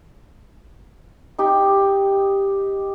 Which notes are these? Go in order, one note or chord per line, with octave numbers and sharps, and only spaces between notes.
D#4 G4